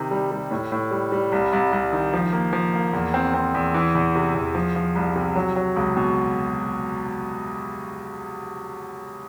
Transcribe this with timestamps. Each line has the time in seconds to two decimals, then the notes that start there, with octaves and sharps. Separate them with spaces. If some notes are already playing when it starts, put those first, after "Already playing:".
Already playing: C3 D#3
0.11 G3
0.32 G3
0.51 A2
0.72 A2
0.91 G3
1.12 G3
1.32 C2
1.53 C2
1.72 C2
1.93 D#3
2.14 F3
2.33 A#3
2.53 F3
2.74 A#3
2.93 E2
3.14 C4
3.34 C4
3.54 E2
3.74 E3
3.95 E2
4.15 C3
4.35 E2
4.55 F3
4.76 F3
4.95 C2
5.16 C3
5.36 F#3
5.56 F#3
5.76 C#2
5.97 B2